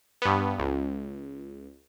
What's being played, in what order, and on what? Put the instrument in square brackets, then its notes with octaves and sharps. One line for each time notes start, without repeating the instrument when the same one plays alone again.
[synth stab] G2 B3
C#2